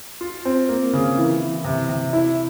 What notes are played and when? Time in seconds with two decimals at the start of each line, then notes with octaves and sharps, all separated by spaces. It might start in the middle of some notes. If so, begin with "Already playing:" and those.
0.21 F4
0.45 C4
0.69 A#3
0.93 C#3
1.17 E3
1.41 E3
1.64 C3
1.89 C3
2.13 E4